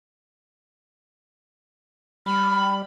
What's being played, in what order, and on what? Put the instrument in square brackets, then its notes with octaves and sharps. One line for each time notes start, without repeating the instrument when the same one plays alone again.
[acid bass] G3 [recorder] B5 [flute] F6